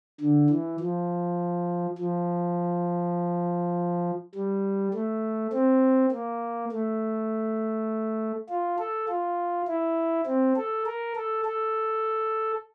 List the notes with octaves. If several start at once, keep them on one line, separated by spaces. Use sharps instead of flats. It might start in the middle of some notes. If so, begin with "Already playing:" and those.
D3
E3
F3
F3
G3
A3
C4
A#3
A3
F4
A4
F4
E4
C4
A4
A#4
A4
A4